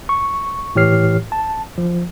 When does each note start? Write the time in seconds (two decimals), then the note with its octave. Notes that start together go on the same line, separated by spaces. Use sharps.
0.09 C#6
0.75 A2 E3 G4 C#5 F6 C7
1.32 A5
1.78 F3